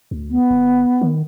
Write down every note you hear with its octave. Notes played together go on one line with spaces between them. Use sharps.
D2
B3
G1
D#3